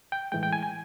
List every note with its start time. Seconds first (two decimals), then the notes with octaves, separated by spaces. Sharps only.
0.12 G5
0.32 A2 E3 G#3 G5
0.43 G5
0.53 G#5
0.63 G#5